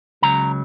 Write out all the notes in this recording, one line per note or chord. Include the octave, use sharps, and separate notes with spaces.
C#2 C#3 F#3 A#5